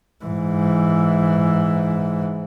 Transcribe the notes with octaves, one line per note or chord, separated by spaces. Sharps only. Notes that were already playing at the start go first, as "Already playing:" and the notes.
G#2 E3